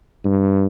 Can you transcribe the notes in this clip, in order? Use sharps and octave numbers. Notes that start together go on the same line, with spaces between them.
G2